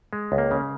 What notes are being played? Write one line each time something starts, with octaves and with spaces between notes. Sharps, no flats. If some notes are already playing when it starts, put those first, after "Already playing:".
G#3
C#2
A#3
C#3